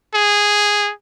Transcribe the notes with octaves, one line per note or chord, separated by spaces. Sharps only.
G#4